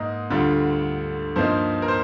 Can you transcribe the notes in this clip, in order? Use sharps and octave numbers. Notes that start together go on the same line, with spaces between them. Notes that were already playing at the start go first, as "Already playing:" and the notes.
Already playing: G#2 A#3 D#5
D2 D3 G3 D4 F4
G2 F3 A#3 D#4 C5
A#4
C5